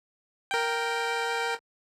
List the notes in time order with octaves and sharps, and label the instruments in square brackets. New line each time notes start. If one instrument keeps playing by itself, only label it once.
[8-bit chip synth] A#4 G5